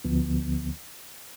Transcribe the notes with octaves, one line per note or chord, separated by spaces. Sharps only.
D2 D3 F3 B3